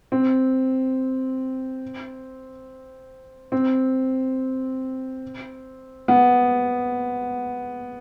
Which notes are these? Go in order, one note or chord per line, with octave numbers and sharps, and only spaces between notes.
C4
C4
B3